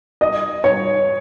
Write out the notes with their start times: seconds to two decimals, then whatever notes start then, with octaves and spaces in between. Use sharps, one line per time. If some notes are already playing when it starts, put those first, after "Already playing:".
0.21 D#5
0.64 C#5